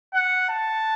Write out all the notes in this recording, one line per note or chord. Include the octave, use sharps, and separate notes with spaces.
F#5
A5